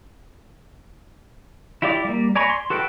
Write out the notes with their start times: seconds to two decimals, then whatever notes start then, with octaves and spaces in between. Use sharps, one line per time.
1.82 E4 F4 G4 D5 D6
2.04 G3 A#3
2.36 D5 G#5 A#5 B5 C#6
2.50 C6
2.70 F#4 A4 B4 F#5 G5